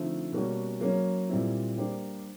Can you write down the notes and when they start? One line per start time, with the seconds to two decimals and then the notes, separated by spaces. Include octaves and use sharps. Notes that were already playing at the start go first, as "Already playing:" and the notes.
Already playing: D3 F3 A3 C4 D#4
0.33 B2 G3 A#3 C#4 F#4
0.81 F#3 A#3 C#4
1.29 A#2 G3 C4 E4
1.77 G3 A#3 D4 G4 C5